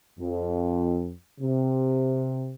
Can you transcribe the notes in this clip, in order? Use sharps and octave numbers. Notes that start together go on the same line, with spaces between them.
F2
C3